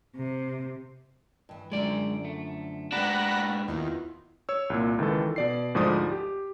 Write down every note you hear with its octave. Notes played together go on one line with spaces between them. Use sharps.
C3
G2 E3
F#2 D3 F3 G#3 D5
A3
G#2 D4 G4 F#5 G5 A#5 B5
D#2 B3 E4 F4
C#5 E6
C2 A#2
C#2 D#3 E3 A4
B2 D5 C7
D2 G#2 F3 D5 D#6
G4